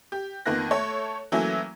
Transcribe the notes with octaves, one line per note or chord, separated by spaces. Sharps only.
G4
F2 D#3 A#3 B3 F#6 A#6
A3 A4 C#5
E3 F#3 A3 A#3 C#4